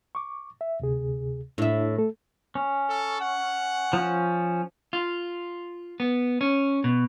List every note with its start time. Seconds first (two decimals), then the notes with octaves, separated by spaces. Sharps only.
0.15 C#6 D6
0.61 E5
0.80 D2 C3 G#4
1.58 A2 D4 E4 E5
1.98 A3 A4
2.55 C#4
2.89 A4
3.21 F#5
3.93 F3 C#4
4.93 F4
6.00 B3
6.41 C#4
6.84 B2